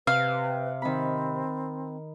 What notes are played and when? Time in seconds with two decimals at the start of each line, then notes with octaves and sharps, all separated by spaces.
0.07 C3 B4 F5
0.82 D#3 C4 B5